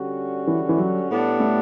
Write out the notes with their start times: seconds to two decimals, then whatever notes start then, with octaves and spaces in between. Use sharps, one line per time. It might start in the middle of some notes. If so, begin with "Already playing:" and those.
Already playing: D3 G3 C#4 F#4
0.47 E3
0.69 E3
0.78 F#3
1.08 A2 G3 B3 D4
1.40 A3